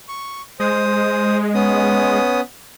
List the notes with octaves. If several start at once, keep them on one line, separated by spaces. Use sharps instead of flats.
C#6
G#3 C5 D#6
B3 C#4 D#6